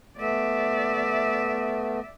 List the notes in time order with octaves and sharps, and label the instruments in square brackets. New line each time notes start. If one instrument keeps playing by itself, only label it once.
[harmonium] A3 B3 [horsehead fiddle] D5 E5